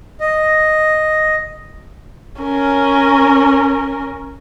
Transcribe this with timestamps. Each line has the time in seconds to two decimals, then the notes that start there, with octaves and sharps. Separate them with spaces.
0.21 D#5
2.42 C#4 A#4